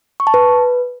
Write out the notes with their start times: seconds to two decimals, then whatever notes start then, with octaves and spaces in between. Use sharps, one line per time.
0.20 C#6
0.27 A5
0.34 B4